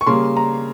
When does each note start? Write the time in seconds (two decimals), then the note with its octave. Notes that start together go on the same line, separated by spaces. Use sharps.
0.01 C#6
0.07 C#3 G3 A#3 C6
0.37 A#5